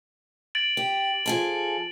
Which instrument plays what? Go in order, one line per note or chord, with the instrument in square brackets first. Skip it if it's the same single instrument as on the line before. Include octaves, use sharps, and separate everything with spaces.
[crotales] A6 D7 F#7
[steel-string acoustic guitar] G4
F3 G#4 A4